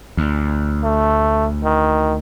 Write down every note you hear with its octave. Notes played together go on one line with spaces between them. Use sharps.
D2
A3
D#3